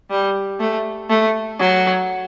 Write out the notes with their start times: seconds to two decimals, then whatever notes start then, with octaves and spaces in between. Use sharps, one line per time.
0.10 G3
0.60 A3
1.10 A3
1.59 F#3